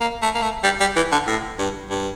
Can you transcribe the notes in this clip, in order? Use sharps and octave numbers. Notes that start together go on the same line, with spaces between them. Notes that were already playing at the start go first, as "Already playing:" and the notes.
A#3
A3
A#3
A3
G3
G3
E3
D3
A2
G2
G2